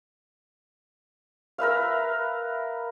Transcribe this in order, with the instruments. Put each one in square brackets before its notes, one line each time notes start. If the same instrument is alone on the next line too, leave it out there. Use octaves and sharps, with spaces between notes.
[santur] A#4 B4 E5 F5